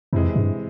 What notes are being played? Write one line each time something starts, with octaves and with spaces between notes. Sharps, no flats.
F2 C3 E3 G#3
G2